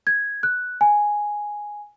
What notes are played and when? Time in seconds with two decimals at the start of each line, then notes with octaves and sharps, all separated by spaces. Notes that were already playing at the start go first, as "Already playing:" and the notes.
0.07 G#6
0.43 F#6
0.81 G#5